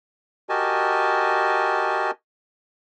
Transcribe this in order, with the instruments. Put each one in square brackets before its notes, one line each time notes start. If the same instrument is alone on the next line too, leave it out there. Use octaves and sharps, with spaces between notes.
[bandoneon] F#4 G4 A#4 D#5 G#5 A5